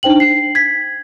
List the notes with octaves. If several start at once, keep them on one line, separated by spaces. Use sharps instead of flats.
D4 D#4 C5 G5 F#7
C7
G#6 B6